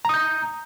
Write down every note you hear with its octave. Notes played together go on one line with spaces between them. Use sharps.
A#5 D#6 G6